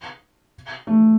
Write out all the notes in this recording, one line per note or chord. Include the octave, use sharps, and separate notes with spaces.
A3